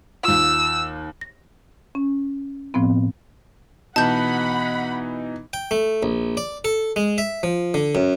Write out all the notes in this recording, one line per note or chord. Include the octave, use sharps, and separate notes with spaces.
D#2 F4 E6
A#6
C#4
A2 F3 B3 C4
B2 E3 D#4 F#5 A5 B5 G6
G5
A3
A#1
D5
A4
G#3
E5
F3
D3
F#2